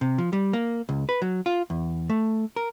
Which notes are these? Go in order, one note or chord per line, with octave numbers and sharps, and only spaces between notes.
C3
F3
G3
A#3
C#2
B4
F#3
F4
E2
A3
A#4